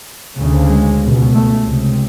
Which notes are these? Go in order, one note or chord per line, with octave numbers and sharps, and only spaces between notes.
D2 C#3
G#3
C#2 B2
A3
C#2 C3